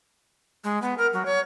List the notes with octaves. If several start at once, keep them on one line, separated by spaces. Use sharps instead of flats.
G#3
B3
A#4
F#3
C#5